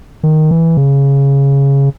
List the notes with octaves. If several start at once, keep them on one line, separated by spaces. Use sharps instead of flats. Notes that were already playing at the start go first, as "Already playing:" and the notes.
D#3
E3
C#3